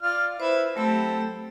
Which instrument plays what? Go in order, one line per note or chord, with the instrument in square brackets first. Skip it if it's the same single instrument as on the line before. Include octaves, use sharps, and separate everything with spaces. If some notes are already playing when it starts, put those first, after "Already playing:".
[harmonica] F4 D5 F6
[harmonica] E4 B4 E5 [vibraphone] C5
[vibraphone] F#3 A3 B5 [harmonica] C4 G4 A4